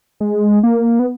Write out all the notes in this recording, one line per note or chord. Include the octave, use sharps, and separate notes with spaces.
G#3
A#3
B3